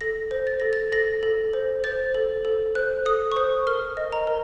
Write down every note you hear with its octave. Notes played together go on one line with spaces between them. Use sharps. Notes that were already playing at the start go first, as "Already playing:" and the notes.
A4 A#6
C5
A6
A4 A#6
A6
A4 A#6
A4
C5
C5 A6
A4
A4
C5 F#6
A4 D#6
C#6
C5 D#6
A#4 F6
D#5
A#5
A#4